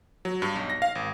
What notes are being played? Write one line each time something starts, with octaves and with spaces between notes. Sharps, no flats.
F#3
G2
B1
A#6
F5
G#1